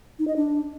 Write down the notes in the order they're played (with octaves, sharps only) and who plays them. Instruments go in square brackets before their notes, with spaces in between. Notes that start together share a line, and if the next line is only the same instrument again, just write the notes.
[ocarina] D#4
D#5
D4